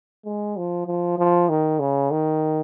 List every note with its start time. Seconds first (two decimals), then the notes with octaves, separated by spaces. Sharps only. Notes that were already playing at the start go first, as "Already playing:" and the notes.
0.25 G#3
0.56 F3
0.86 F3
1.18 F3
1.49 D#3
1.79 C#3
2.11 D#3